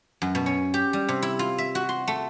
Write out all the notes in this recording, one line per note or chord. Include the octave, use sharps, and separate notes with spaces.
F#2
B2
C#4
G4
G3
C3
E4
F4
E5
F#4
C6
A3